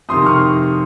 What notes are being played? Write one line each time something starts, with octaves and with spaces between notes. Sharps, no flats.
F2 C3 D#3 C6 D#6
C#6 F6